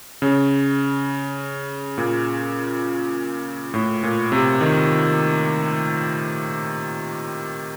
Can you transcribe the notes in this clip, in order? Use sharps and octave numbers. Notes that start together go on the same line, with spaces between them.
C#3
A#2
A2
A#2
C3
D#3